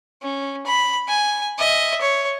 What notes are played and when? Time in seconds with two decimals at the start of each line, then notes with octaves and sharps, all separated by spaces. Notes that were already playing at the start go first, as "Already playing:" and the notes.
0.22 C#4
0.66 B5
1.08 G#5
1.58 D#5 E5
2.01 C#5